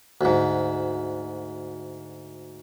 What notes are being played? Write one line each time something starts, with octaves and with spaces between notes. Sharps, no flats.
D2 G#2